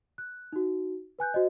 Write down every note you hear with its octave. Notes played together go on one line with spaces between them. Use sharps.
F#6
D#4 F#4
B4 G#5 F#6 G6
F#4 C5 D#5